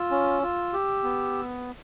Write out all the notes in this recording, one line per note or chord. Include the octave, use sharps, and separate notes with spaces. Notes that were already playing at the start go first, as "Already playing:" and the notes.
Already playing: F4 E6
C#4
F4
G4
B3